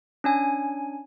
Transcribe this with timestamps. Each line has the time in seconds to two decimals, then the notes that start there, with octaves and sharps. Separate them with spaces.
0.24 C#4 D4 G#5